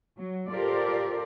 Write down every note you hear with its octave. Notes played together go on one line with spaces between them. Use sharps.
F#3
F4 G4 A4 A#4 C5 D5